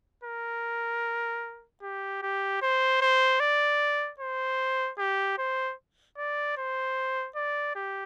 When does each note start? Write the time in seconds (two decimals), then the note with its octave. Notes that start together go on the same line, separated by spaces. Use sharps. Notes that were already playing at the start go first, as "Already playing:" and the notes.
0.24 A#4
1.82 G4
2.22 G4
2.62 C5
3.01 C5
3.40 D5
4.20 C5
4.98 G4
5.38 C5
6.18 D5
6.57 C5
7.36 D5
7.75 G4